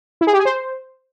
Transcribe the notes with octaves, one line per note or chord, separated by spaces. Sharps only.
E4
G#4
G4
G#4
C5